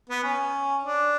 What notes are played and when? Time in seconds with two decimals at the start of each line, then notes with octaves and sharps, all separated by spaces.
0.09 B3
0.23 C#4
0.84 D4